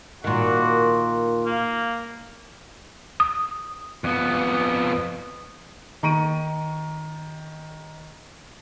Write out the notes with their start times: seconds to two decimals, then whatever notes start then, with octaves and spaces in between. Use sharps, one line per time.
0.24 A#2 D#3 F#4
1.46 A#3
3.20 D#6
4.04 F2 B3
6.03 D#3 A#5 C#6 D7 D#7